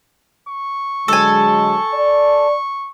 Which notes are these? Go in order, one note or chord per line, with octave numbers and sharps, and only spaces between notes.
C#6
D3 F#3 G#3 A4 G#5
D5